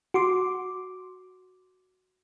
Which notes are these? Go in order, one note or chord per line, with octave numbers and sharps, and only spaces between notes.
F#4 C6 D6